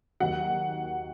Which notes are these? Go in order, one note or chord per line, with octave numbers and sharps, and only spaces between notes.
D#2 D#3 F#3 F#5